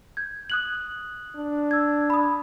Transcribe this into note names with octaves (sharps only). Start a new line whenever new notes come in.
G6 G#6
D#6 F#6 F#7
D4
E6 G#6
B5 D#6